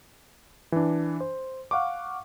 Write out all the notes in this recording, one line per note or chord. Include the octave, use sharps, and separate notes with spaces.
E3 D4
C5
F5 F#5 C#6 D6